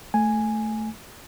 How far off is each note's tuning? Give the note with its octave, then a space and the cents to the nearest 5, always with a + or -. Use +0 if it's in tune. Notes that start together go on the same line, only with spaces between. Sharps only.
A3 +0 G#5 +0